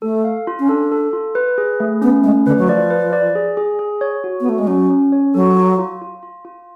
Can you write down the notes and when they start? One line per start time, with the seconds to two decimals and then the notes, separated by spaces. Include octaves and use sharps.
0.02 A3 A4
0.24 F5
0.47 F4
0.59 C#4
0.68 D4 A4
0.92 A4
1.13 F4
1.35 B4
1.58 G#4
1.80 A3
2.01 B3 C#4
2.24 G#3 A3
2.46 D3 B4
2.58 F#3
2.68 F3 D5
2.90 B4
3.13 D5
3.35 G#4
3.57 G#4
3.79 G#4
4.01 C#5
4.24 F#4
4.40 B3
4.46 A3 F#4
4.59 G#3
4.67 F#3 C#4
4.90 C#4
5.12 C#5
5.34 F#3 A4
5.57 F4
5.79 F4
6.02 F4
6.23 F4
6.45 F4